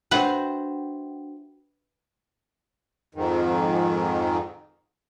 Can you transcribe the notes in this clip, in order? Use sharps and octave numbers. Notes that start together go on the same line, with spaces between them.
D4 F#4 B4 C5 E5 F#5 G5
F2 G#2 D#3